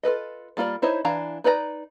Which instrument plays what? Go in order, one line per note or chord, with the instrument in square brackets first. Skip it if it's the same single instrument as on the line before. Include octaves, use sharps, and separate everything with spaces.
[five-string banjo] F4 A4 B4 D#5
G3 A#3 F4 F#4 D5
D#4 E4 C5 C#5 D#5
E3 D4 E4 F5 A#5
D#4 B4 D5 D#5 A#5